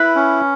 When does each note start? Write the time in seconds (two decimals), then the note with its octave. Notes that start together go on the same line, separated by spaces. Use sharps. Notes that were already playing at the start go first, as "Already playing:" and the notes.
Already playing: E4 B4
0.15 C#4